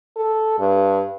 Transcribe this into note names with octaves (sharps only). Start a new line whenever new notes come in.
A4
G2